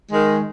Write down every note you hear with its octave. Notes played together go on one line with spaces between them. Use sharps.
D#3 G#3